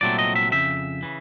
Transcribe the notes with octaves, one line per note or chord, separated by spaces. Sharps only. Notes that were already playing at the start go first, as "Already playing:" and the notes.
C2 A#2 F#3 A3 C4 D5
D#5
E5
F2 C#3 E5
C#3 E3